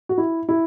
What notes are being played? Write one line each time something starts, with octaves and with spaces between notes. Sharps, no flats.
F#4
E4
E4